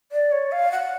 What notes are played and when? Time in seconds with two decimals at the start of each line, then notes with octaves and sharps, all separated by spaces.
0.12 D5
0.32 C#5
0.52 F5
0.72 F#5